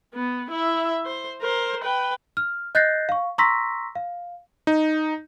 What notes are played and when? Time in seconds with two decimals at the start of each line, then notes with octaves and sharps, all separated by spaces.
0.14 B3
0.51 E4 E5
1.06 C5
1.42 A#4 C5
1.83 B4 G5
2.37 F6
2.75 D#5 F#6 G6 A6 A#6 C7
3.09 F5 C#6
3.38 A#5 C6 C#6 E6 A#6 B6
3.95 F5
4.67 D#4